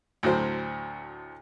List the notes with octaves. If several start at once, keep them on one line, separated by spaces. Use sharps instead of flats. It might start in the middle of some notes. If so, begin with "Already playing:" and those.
D2 A2 F#3 C5